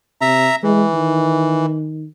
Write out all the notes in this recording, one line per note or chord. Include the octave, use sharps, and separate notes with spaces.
C3 E5 A#5
E3 G#3
D#3